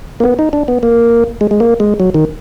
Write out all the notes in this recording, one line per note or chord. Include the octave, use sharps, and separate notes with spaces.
A#3
B3
D#4
D4
B3
A#3
G#3
G#3
A#3
G#3
F#3
D#3